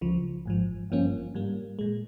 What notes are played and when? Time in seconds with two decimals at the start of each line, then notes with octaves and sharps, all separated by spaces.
0.01 C#2 C#3 F3
0.45 G#1 G#2 F3
0.90 G1 G2 F3 A#3 C#4
1.34 G#2 G3 A#3
1.79 A#2 G#3